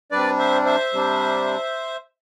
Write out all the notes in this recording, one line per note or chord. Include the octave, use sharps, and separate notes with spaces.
C3 G3 D4 B4 D5
C5 E5
C5 E5
C3 G3 D4